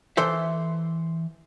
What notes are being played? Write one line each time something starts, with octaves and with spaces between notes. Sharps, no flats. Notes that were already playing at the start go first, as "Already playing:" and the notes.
E3 A4 C5 E5